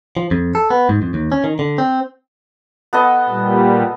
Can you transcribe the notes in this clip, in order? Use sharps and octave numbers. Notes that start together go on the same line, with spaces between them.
F3
F2
A4
B3
G#2
F2
D#2
C#4
D#3
D3
C4
B3 A4 D#5
A#2 G3